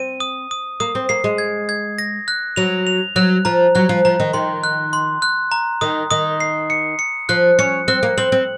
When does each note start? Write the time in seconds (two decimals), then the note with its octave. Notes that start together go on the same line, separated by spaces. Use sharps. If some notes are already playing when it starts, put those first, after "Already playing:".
Already playing: C4 D#7
0.20 D#6
0.51 D#6
0.80 A#3 D#6
0.95 C4
1.09 A#3 C7
1.24 G#3
1.38 G#6
1.69 G#6
1.98 A#6
2.28 F#6
2.56 F#3 F7
2.87 F7
3.16 F#3 F#6
3.45 F3 A#5
3.75 F#3 F#6
3.89 F3
4.05 F3 A#5
4.20 D#3
4.34 D#3 C6
4.64 F#6
4.93 C6
5.22 F#6
5.51 A#5
5.81 D#3 D#6
6.11 D#3 D#6
6.40 C7
6.70 C#7
6.99 C#7
7.29 F3 F#6
7.59 C#4 C#7
7.88 C4 F#6
8.03 A#3
8.18 C4 F#7
8.32 C4